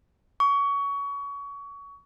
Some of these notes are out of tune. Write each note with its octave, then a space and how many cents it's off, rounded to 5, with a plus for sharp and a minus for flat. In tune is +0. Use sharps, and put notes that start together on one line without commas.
C#6 +25